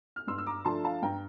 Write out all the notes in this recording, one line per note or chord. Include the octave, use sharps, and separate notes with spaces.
F6
G2 C6 E6
E6
A#5 D6
F3 A3 D4 A5 C6
F5 A5
G2 G5 A#5